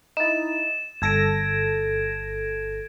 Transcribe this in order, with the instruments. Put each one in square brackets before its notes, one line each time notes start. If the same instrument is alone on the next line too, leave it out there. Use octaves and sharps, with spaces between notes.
[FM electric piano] D#4 E4 [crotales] A6 E7
[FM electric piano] G1 A4 A#6 [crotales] G#6 D7